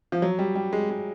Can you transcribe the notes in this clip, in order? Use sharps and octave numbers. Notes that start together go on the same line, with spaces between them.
F3
F#3
G3
G3
G#3
G#3